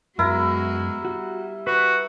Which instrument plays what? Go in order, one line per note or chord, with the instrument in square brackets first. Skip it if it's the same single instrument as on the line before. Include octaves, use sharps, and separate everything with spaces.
[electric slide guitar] F#2 [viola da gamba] G#3 B3 F#4 [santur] E4 A#4
[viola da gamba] G3 [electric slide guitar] F#4
[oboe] F#4 [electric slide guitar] B4